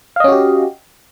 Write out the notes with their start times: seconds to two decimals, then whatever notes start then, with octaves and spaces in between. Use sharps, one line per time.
0.16 F5
0.20 D#5
0.24 C#4
0.28 F#4
0.32 G4